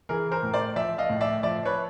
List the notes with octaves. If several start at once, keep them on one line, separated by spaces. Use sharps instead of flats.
E3 G#4 A#4
A#4 C5
A2
C5 D5
F3 D5 E5
D#5 F5
A2
D5 E5
F3 D5 E5
B4 C#5